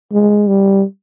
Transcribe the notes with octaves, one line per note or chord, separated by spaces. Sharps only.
G#3
G3